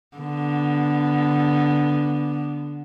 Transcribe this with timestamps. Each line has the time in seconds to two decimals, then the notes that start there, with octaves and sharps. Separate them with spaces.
0.17 D3 B3